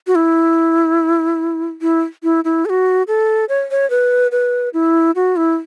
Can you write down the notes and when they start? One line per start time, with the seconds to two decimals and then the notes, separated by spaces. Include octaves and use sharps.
0.07 F#4
0.15 E4
1.81 E4
2.23 E4
2.45 E4
2.65 A4
2.70 F#4
3.07 A4
3.49 C#5
3.71 C#5
3.90 B4
4.32 B4
4.74 E4
5.15 F#4
5.36 E4